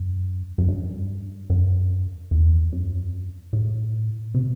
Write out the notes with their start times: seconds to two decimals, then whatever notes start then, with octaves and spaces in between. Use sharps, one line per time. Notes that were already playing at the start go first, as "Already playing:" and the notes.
Already playing: F#2
0.58 F#2
0.68 G2
1.50 F#2
2.31 E2
2.72 F#2
3.53 A2
4.34 C3